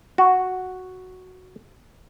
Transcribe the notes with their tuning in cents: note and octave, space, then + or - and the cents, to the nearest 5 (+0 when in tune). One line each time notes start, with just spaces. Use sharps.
F#4 +0